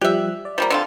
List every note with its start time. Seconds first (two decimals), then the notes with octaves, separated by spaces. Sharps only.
0.01 F3 G3 G4 E5 F#6
0.45 D5
0.58 F3 G3 A#3
0.70 D3 C4 F4